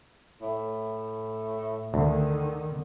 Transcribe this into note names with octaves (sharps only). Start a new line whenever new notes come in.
A2
D2 D3 D#3